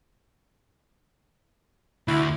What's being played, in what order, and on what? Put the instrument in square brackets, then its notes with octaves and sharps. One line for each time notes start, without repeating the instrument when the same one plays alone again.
[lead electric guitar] D2 [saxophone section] E4